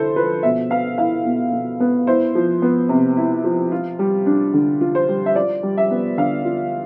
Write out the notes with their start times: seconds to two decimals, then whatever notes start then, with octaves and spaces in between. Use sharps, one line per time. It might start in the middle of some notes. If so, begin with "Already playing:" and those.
Already playing: D3 E4 A4 C5
0.16 F3 B4
0.43 B2 E5
0.70 B3 F5
0.98 E4 F5
1.25 B2
1.52 B2
1.80 B3
2.07 E4 C5
2.35 F3
2.62 B3
2.89 C3
3.17 E4
3.44 F3
3.72 F4
3.99 G3
4.26 D4
4.54 D3
4.81 F4
4.95 C5
5.09 G3
5.26 E5
5.35 F4 D5
5.63 G3
5.77 E5
5.91 B3
6.18 D3 F5
6.45 F4